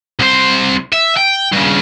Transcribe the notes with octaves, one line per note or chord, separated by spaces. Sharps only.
C2 C5
E5
G5
G2 C#3